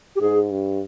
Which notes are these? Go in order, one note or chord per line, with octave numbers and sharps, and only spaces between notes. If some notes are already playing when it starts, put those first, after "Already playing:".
G4
G#2 G#4
G2